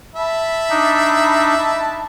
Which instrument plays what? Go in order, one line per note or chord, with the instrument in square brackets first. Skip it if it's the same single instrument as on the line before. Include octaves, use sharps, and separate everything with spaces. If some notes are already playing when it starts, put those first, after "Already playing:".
[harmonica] E5 A5 B5
[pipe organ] D4 D#4